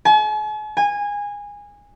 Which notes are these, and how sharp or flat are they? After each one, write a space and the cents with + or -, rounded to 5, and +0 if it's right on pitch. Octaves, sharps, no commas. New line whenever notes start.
G#5 +45
G#5 -20